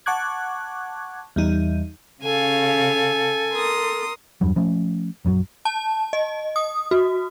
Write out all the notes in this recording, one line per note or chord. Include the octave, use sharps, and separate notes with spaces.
F#5 A5 C#6 D6 F#6 G#6
E2 G3 D#4
C#3 A4 F5 G#5
A#4 C6 D#6
E2 G2 F#3
F3 A3 C#4
A#1 F#2 D#3 F#3
A5
D#5
D#6
F#4